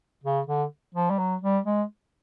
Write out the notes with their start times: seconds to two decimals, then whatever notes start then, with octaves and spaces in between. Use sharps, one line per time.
0.24 C#3
0.47 D3
0.94 F3
1.10 G3
1.19 F#3
1.42 G3
1.66 G#3